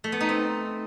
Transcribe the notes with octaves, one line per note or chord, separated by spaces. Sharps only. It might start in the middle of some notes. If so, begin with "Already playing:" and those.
A3
B3
D#4
C4